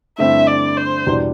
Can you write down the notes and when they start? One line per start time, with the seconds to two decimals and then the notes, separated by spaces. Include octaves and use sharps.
0.18 G2 D3 A3 C4 E4 E5
0.47 D5
0.77 C5
1.07 E2 B2 G3 D4